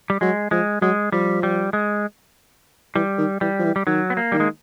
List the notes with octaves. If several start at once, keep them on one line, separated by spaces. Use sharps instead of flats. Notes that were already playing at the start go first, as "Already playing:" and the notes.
G3
F#3 G#3
F3 G#3
F#3 G#3
F3 G3
G3
G#3
E3 G3
D#3
E3 G3
F3
E3
G3
D#3 F#3
B3
A#3
D#3 G3
G#3